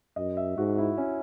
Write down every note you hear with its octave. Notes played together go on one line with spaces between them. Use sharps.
F#2 D#5
E5
G#2 F#4
E4
C#4